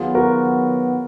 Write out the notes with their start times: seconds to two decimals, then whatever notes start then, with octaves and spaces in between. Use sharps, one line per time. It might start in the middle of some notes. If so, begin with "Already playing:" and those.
Already playing: D#3 F#3 B3 F4 G#4
0.15 F#4 A#4